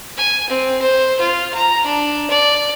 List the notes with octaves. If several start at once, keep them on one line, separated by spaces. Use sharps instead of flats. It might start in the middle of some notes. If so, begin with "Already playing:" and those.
G#5
C4
C5
F4
A#5
D4
D5